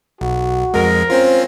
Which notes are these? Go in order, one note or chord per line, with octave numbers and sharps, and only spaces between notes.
B1 F#4
F2 G#3 A#4
C4 C#4 F4 C5